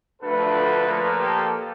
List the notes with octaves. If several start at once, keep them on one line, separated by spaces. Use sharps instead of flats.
D2 D3 F3 A3 A4 B4
A#2 F3 A#3
G4 A4